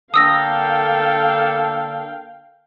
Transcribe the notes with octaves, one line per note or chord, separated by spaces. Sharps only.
D3 A#3 A4 F5 G5 D#6 E6 A#6